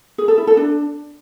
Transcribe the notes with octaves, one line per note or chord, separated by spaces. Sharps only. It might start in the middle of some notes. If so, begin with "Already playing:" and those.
G#4
A4
E4
A4
D4